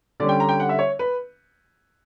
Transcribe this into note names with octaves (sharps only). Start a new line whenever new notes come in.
D3 G3 C#4 D5
G5
A#5
G5
F#5
E5
C#5
B4